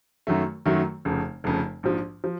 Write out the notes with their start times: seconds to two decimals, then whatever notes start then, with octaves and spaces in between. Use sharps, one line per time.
0.27 F#2 D#3 F#3 A3
0.66 F#2 D#3 F#3 A3
1.05 F1 F2 C#3
1.44 F1 F2 C#3
1.83 A#1 G#2 F3
2.24 F3